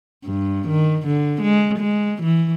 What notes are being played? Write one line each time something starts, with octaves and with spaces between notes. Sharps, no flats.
G2
D#3
D3
G#3
G#3
E3